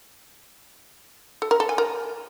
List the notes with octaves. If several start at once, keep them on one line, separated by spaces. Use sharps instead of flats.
A4
A#4
A4
G#5
A#4